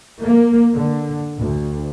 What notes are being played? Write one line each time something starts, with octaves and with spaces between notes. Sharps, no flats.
A#3
D3
D2